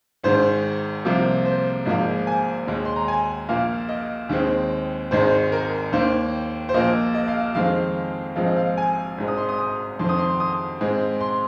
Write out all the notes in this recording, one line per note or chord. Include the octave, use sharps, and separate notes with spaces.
G#1 G#2 D#3 C5
C2 C3 F3 A#3
C5
G#1 G#2 F3 A#3 D#5
G#5
D#2 D#3 G#3
C6
A#5
G#5
A#1 A#2 A#3 F5
D#5
D#2 D#3 G#3 C4
G#1 G#2 D#3 G#3 C4 C5
A#4
D#2 D#3 A#3 C5
C5
A#1 A#2 A#3 D#5
D#5
F5
D#5
F2 D#3 G#3 C4 F5
A#1 G#2 F3 G#3 C4 F5
D#5
F5
G#5
G#1 G#2 G#3 C4
D#6
C6
D#6
D#6
F2 D#3 C4 C6
D#6
C6
D#6
G#2 G#3 C4
C6